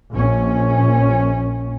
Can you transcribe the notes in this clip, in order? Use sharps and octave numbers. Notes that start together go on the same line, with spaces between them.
A#1 C#4